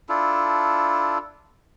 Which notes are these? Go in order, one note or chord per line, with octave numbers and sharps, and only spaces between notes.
D4 E4 F4 A4